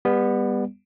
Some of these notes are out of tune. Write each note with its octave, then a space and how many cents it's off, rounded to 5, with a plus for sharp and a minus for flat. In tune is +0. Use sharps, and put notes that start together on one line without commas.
G3 +30 B3 -5